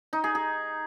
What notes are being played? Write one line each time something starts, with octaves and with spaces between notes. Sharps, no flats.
D#4
G#4
G#4